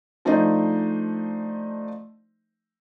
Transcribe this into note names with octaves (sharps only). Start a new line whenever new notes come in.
F3 A3 D4 D#4 C5 D#5